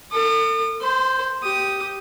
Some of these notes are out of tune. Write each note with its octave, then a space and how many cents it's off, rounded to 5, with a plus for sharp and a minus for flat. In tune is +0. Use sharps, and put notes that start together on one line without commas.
A4 +40 D#6 -40
C5 +0 C6 -35
G4 -10 D#6 +0